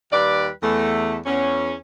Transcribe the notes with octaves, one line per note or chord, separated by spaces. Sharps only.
D#2 G3 B4 D5
E2 A3
E2 C#4